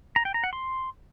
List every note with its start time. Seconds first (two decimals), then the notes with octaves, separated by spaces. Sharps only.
0.16 A#5
0.25 G5
0.34 A#5
0.44 F#5
0.53 C6